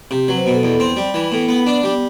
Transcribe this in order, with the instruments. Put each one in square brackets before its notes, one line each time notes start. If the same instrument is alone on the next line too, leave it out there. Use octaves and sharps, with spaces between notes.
[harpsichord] C3 [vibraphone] G4
[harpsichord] F#3 [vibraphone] B4
[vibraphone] C5
[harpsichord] B2 [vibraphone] B4
[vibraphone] A4
[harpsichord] E2
C4
G3
E3
[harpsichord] A2 [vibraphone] B3
[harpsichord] B3
D4
[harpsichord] G3 [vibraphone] B3